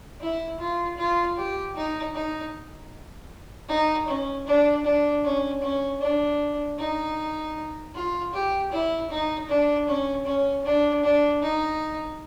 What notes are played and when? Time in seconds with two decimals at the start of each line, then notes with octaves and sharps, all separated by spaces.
0.21 E4
0.59 F4
0.98 F4
1.37 G4
1.75 D#4
2.15 D#4
3.69 D#4
4.08 C#4
4.47 D4
4.84 D4
5.24 C#4
5.62 C#4
6.01 D4
6.78 D#4
7.95 F4
8.33 G4
8.72 E4
9.10 D#4
9.49 D4
9.87 C#4
10.26 C#4
10.65 D4
11.03 D4
11.42 D#4